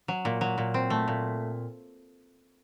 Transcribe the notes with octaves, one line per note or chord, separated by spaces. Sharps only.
F#3
A#2
F#3
A#2
C4
A3
A#2